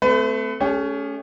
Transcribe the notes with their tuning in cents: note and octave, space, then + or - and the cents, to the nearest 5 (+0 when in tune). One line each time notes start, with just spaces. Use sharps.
A3 +0 C4 -30 B4 +35
A3 -10 C#4 +15 G4 +45